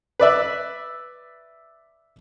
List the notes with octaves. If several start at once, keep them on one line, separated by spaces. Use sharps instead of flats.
B4 D5 E5